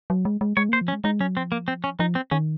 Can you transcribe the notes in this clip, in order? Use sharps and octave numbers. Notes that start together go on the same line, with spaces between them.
F#3
G#3
G#3
G#3 C#5
A#3 C5
F3
C#4
G#3
G#3 D#4
F#3 C#4
F3 C4
A#3
C4
C#4
F3 D#4
C4
D#3 C#4